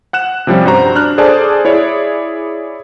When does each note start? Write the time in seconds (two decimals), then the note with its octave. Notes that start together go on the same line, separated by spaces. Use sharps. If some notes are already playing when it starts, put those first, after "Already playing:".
0.13 F#5 F#6 E7
0.47 C3 F3 G3 C#4
0.65 G2 F#4 C5 A#5
0.95 D4 F6 F#6
1.18 G#4 A4 C5 D5 G#5 A5
1.65 E4 G#4 C#5 D5